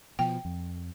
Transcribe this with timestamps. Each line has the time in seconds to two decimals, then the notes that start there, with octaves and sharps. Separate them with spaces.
0.19 B2 F3 G5
0.45 F2